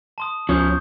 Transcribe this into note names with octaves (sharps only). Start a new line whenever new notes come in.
A5 C6 D#6
C#2 F3 C#4 C#6 D#6 G6